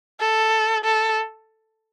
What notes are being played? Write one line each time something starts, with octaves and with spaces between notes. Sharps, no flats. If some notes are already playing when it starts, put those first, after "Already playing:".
A4
A4